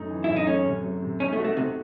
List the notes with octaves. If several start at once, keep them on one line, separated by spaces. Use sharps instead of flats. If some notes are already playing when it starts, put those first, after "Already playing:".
Already playing: F#2 A3 D#4
E3
F#2 E4
D#4
A3 C#4
C3
F#3
C3
C#4 D#4
A3
F#4
A3
C3 A3